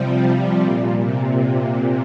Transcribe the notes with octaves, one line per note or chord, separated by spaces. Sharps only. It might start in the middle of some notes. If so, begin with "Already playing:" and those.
Already playing: C3 F3 G3
C3
A#2
C3
A#2